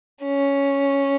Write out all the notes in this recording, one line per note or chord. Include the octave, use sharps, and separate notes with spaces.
C#4